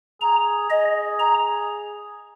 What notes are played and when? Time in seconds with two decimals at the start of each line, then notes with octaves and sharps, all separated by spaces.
0.21 G#4 A#5
0.70 G#4 D#5
1.19 A#5